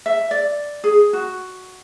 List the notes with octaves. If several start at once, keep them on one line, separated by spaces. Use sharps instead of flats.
E5
D5
G#4
F#4